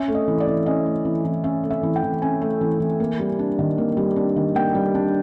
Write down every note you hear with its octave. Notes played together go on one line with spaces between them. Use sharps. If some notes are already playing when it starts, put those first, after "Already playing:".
Already playing: C#4 E5
A3
D#5
E3
D5
E3
C#4 D#5
A3
E3
E3
C#4 E5
A3
E5
E3
G5
E3
C#4 G#5
A3
E3
E3
A#3
G3
D4
D#3
A#3
G3
D4
D#3
A#3 G5
G3
D4